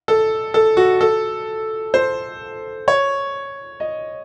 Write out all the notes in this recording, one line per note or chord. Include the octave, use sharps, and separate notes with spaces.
A4
A4
F#4
A4
C5
C#5
D#5